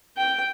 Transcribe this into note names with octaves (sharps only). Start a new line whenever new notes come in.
G5